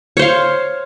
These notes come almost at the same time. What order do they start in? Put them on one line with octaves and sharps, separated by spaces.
C#5 C5 F5